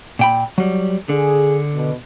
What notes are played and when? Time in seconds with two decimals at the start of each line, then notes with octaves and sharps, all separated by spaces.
0.19 A#2 G5 B5
0.58 F#3 G3
1.09 D3 G#4
1.74 B2